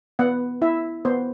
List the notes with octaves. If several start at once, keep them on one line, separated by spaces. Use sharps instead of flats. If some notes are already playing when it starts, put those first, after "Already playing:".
B3 F#5
E4 E5
B3 C5